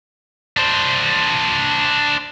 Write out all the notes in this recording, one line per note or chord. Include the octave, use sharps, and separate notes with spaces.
D4 C5